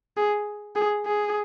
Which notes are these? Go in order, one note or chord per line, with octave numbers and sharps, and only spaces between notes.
G#4
G#4
G#4